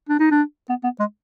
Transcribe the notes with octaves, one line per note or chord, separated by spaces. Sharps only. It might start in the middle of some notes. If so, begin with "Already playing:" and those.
D4
D#4
D4
B3
B3
G#3